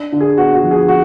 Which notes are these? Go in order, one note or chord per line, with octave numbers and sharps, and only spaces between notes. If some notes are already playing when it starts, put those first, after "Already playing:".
Already playing: D4
D3
G#4
B3 F#4
F#4
F3
G#4
F#4